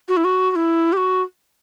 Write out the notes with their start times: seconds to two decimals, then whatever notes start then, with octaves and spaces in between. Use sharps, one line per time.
0.08 F#4
0.17 E4
0.24 F#4
0.51 F#4
0.56 E4
0.93 G4
0.97 F#4